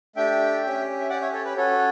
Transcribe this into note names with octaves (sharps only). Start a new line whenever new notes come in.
A3 D4 G4 E5 G5
C#4 G4
E5
C#4 G4 D5 F#5
C#5 E5
A4 C#5
B4
C#4 F#4 A4 C#5